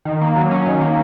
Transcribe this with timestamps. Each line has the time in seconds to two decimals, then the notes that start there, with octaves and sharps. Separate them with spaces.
0.05 D#3
0.21 A#3
0.36 F#3
0.51 C#4
0.66 D#3
0.81 A#3